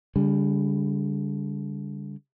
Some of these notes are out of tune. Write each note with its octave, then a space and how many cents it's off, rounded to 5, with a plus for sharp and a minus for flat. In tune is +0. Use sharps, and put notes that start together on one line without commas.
D3 -40 G3 +25